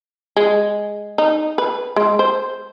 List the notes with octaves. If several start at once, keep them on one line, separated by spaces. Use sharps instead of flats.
G#3
D#4
B4
G#3
C5